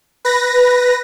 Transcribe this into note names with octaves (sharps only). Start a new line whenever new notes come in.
B4 A#6